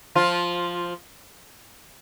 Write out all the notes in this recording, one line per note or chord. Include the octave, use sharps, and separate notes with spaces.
F3 F4